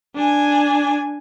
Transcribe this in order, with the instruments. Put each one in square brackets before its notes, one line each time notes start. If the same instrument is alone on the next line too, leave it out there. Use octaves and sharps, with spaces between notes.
[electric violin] D4 G#5